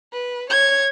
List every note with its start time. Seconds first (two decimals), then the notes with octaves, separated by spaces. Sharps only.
0.13 B4
0.49 C#5 G#6